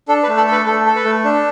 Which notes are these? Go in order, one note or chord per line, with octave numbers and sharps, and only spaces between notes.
D4 A4
B4
A3
A4 D5
A4 B4
A3 A4
A4
B4
A3
D4